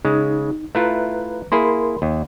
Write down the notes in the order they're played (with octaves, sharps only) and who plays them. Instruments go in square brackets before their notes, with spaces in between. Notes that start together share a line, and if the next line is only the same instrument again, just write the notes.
[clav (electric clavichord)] C#3 G#3 [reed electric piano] D#4
[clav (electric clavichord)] A3 E4 F4 [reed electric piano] B4 A#5 F#6
[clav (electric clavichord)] A#3 E4 G#4 [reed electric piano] A#4 B5 C6
[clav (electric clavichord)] D#2